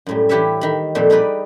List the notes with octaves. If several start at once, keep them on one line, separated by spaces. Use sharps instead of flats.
F#2 A2 G3
E3 E4 G4 B4 C#5 E5
D#3 B5
F2 A#2 G3 A4 C5
G3 D#4 G#4 B4 D5 D#5